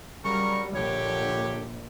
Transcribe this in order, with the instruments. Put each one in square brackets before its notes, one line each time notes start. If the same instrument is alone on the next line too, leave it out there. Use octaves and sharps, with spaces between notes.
[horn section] C#3 F#3 A#4 [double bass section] G3 [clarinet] C#6
[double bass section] A#1 [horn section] D3 G4 [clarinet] C#5